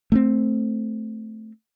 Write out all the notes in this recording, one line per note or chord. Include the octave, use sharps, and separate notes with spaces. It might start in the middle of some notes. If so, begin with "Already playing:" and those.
A3 B3 C4